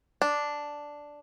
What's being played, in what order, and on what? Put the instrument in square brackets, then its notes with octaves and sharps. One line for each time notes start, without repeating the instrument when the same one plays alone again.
[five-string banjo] D4